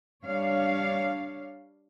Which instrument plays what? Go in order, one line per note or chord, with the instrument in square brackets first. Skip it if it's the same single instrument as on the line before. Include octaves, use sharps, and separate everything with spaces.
[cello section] G3 D4 C#5 F5